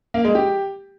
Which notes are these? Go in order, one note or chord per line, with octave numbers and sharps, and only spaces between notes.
A#3
G#3
G4